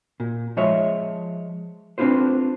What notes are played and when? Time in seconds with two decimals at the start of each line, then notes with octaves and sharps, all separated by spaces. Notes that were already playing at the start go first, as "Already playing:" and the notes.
0.20 A#2
0.57 F3 G#3 C#5 E5
1.98 A3 C4 D4 F4 B4 C5